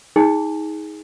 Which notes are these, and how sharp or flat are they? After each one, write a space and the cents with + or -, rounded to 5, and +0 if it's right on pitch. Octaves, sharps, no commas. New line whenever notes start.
D#4 +30 G#4 +0 G#5 -5